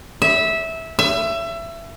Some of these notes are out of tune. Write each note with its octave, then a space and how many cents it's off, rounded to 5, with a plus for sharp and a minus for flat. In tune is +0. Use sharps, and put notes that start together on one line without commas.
E5 -15
E5 +25